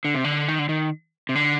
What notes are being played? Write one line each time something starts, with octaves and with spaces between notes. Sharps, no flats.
D3
C3
D3
D#3
D3
D#3
C3
D3